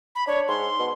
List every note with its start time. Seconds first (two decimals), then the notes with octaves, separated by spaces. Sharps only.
0.15 B5
0.27 D4 C#5
0.48 G#2 C6
0.79 B2